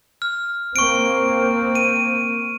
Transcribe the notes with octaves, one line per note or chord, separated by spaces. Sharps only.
F6
A#3 C4 C#6 D7
D#7